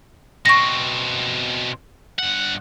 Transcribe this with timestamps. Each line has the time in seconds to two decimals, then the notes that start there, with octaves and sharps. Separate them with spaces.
0.46 B2 C4 C#6 A#6
2.18 G2 F#5